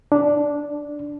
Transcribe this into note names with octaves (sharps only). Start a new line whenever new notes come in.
D4